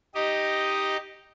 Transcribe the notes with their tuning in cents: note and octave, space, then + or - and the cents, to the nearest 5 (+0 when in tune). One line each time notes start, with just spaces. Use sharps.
D#4 +0 G4 +0 D#5 +0